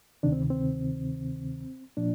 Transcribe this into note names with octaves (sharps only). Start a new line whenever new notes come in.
D2 C3 D#3 D4
C4
C4
A#2 F3 D4